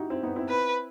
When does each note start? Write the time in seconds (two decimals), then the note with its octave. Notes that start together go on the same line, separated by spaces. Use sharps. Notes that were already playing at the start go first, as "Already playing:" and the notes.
Already playing: D#4 E4 F#4 G4
0.10 C4 E4
0.23 B3 D#4
0.36 C4 E4
0.49 B4